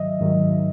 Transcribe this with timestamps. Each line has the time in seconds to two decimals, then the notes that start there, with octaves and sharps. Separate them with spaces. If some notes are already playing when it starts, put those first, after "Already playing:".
Already playing: G#2 D#3 F#3 D#5 E5
0.20 G#2 D#3 F#3